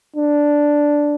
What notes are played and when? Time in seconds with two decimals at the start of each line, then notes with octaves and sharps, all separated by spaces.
0.16 D4